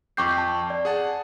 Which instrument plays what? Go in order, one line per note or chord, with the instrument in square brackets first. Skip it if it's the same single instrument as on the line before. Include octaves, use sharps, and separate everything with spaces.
[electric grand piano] F2 G5 C7 [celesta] C#6 D6 G6
[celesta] A5
D5
[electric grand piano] G#4 F#5 A5